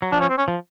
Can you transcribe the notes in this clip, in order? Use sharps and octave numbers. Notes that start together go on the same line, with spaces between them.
F#3
F3 D4
C#4
C4
C#4
F3